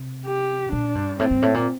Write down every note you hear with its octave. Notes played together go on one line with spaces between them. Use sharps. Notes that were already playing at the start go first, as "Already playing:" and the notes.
Already playing: C3
G4
A#2 D4
G2
A2 C4
G2
A2
A#2